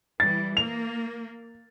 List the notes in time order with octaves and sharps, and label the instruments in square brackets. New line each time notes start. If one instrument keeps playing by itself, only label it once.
[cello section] E3 G3 [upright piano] A6
[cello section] A#3 [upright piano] F7